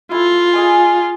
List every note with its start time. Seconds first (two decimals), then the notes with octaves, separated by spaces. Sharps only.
0.11 E4 F4 A4
0.53 G#4 D#5 G#5